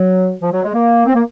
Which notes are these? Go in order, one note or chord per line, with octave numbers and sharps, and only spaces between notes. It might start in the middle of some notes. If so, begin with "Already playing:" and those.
Already playing: F#3
F3
F#3
G#3
A#3
C4
A#3